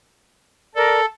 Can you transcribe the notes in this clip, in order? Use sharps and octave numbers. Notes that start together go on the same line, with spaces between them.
A4 A#4 D5